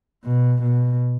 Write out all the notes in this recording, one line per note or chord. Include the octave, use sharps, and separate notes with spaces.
B2
B2